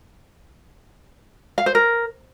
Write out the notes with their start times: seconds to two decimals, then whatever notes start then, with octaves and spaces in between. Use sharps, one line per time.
1.58 F5
1.66 C5
1.75 A#4